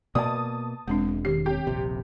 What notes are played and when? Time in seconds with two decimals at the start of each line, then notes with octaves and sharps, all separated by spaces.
0.15 B2 A#3 D5 A5 D#6
0.88 E1 G#3 C4 D4
1.25 D#3 G4 C7
1.46 C4 G4 C#5
1.67 D#1 A#1 C3